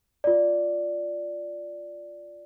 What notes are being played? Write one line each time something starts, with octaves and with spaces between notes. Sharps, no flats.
F4 D5